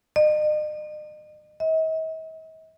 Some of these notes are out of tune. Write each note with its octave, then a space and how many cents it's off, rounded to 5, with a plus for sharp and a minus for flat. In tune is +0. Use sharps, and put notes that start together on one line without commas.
D#5 -45
D#5 +45